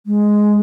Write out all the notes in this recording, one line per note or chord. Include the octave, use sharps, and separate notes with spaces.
G#3